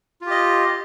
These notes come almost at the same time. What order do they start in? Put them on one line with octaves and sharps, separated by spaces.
F4 G4 D#5